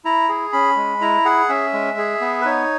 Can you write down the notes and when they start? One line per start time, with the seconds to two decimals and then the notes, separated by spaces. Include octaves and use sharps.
0.05 E4 A#5
0.29 G#4
0.52 C#4 B5
0.76 G#3
1.01 E4 A#5
1.25 G#4 F#5
1.49 C#4 E5
1.73 G#3
1.98 G#4
2.21 B3
2.41 B4
2.45 D#4 C#5